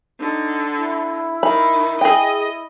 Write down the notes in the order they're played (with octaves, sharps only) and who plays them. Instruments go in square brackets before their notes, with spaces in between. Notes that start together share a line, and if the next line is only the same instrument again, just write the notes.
[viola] D3 [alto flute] D#4
[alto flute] E4
[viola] D#3 [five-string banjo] B5
[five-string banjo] G#4 G5 [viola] D#5